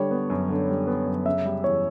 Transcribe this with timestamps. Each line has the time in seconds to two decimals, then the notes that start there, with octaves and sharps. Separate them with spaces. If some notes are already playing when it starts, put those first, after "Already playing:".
Already playing: D3 G3 C#5
0.11 B3
0.30 F#2
0.49 D3
0.69 G3
0.87 B3
1.06 F#2
1.26 C#3 E5
1.45 G3
1.64 E2 C#5